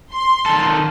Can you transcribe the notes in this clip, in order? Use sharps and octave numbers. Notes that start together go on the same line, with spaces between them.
C6
D#3 A4